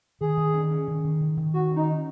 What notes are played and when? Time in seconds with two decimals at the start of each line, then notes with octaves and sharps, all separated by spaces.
0.21 D#3 G#4
0.37 D#3
0.54 C#4
0.71 C#4
0.88 D#3
1.04 D#3
1.21 D#3
1.37 D#3
1.54 D#3 F#4
1.71 C#4
1.76 D#4